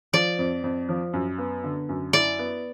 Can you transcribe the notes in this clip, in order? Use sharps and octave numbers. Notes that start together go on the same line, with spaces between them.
F3 D5
F2
F2
F3
F#2
B3
D3
F#2
E4 D5
B3